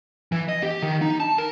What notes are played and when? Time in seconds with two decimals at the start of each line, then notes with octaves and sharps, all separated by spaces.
0.32 E3
0.49 D#5
0.63 G4
0.82 D#3
1.02 D#4
1.20 A5
1.38 A#4